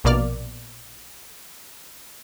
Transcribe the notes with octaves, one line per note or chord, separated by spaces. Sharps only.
A#1 B2 A#3 D5 F6